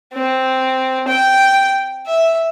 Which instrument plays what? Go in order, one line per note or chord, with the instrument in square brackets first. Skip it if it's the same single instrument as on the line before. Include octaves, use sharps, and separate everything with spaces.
[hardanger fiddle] C4
G5
E5